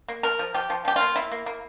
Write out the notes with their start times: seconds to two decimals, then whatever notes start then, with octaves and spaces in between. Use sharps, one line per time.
0.08 A#3
0.23 F3 A#4
0.39 F3
0.54 F3 G4
0.70 F3
0.85 F3 G4
0.96 A#3 F4
1.16 A#3 E4
1.32 A#3
1.46 A#3